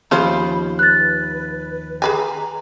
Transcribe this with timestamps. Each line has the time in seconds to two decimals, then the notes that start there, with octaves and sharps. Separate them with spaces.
0.11 D#2 F3 C#4 F4 C5 B5
0.79 B4 F#6 A6
2.02 G#4 B4 G#5 A#5